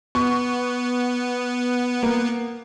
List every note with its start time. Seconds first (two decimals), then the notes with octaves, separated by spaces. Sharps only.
0.15 B3 C#6
2.03 A#3